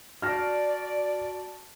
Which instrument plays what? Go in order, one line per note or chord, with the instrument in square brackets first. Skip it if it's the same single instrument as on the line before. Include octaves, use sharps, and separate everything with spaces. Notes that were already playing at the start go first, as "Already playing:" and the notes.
[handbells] F#4 A5 [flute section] D5 [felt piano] F6 A#6